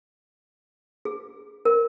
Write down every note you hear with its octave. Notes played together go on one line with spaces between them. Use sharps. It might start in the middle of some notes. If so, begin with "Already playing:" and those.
G#4
A#4